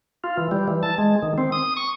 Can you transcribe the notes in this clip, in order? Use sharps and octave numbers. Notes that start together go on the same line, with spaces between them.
F4
E3
G3
E3
A5
G#3
D#3
C4
D#6
C#6